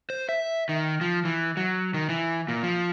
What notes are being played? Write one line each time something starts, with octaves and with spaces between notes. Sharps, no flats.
C5
E5
D#3
F3
E3
F#3
D#3
E3
A#2
F3